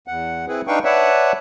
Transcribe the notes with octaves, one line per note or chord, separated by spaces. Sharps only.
E2 F#5
C4 E4 G#4 B4
D4 D#4 B4 F5 G5 C#6
B4 C#5 D5 E5 F#5 A5